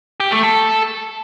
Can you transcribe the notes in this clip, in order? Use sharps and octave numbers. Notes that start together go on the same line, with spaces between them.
G4
A3
A4